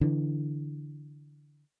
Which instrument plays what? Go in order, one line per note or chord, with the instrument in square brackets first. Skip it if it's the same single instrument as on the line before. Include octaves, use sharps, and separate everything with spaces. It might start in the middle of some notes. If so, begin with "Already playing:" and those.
[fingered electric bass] D3 E3